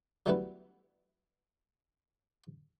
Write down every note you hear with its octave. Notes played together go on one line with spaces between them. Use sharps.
F#3 G3 A3 B3 E4 B4